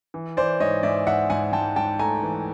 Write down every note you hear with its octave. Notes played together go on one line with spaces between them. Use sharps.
E3
E3 C5 D5
G#2 C#5 D#5
G#2 D5 E5
G#2 E5 F#5
G#2 F#5 G#5
G#2 G5 A5
G#2 G5 A5
A3 G#5 A#5
E3